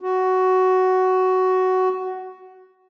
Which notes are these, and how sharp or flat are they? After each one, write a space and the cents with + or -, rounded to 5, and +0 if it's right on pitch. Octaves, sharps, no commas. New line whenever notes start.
F#4 +10